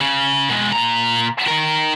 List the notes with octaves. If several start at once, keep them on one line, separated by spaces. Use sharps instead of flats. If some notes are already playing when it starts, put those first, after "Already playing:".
C#3
B2 G#3
A#2 A#5
D#3 A#4